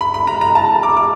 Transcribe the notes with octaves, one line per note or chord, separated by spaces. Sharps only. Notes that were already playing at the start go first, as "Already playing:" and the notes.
B5
B5
A#5
A#5
A5
D6
D6